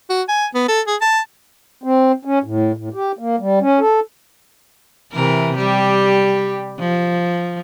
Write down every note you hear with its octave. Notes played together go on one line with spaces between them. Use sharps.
F#4
G#5
B3
A4
G#4
A5
C4
C#4
A2
A2
G4
A#3
G3
C#4
A4
C3 E3 A#4
G3 G4
F3